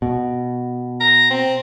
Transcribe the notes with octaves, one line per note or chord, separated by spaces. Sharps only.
B2
A#5
C4